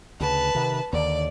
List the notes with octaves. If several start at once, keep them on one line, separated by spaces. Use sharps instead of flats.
D2 C#3 B4 A5
C3 D#3
D#2 D3 D5